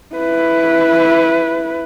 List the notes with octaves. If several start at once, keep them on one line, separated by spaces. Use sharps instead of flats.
E4 B4